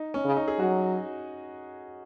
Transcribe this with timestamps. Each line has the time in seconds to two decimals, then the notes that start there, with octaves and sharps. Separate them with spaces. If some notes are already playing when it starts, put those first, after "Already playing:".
Already playing: D#4
0.14 C#4
0.25 C#3
0.36 D#4
0.48 G#4
0.59 F#3 F#4